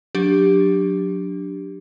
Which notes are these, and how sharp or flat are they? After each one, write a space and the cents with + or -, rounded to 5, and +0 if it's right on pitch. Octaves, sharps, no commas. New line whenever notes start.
F#3 -20 D4 +0 G4 +0